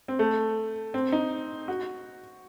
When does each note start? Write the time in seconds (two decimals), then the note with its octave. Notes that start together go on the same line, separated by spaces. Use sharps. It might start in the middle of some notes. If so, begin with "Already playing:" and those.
0.08 C4
0.19 A3
0.94 C4
1.12 D#4
1.68 F#4